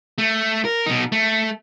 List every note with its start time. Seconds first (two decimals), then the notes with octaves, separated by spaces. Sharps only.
0.18 A3
0.65 A#4
0.86 B2 D#4
1.12 A3